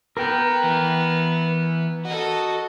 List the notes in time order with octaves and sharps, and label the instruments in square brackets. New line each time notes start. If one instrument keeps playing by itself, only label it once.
[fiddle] B3 [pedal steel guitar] A#4 G5
[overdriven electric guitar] E3
[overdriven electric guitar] F#4 [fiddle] A4 D#5